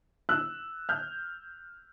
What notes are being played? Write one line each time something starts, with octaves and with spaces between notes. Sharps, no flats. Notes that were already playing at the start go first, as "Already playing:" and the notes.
E6 F#6
F6 G6